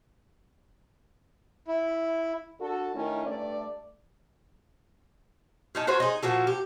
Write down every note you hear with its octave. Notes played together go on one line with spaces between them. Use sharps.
E4
D4 F#4 A4
D#3 A3 C#4 D4 E4
G2 A3 D5
C#4 D#4 A4
F4 F#4 C5 C#5
D#4 G#4
A#2 F3 F#4 A4
G4